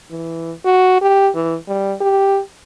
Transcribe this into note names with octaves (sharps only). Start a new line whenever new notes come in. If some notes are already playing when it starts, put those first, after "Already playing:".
E3
F#4
G4
E3
G3
G4